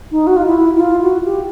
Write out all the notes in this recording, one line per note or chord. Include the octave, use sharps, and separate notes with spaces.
D#4
F#4
F4
E4
E4
F4
F#4
G4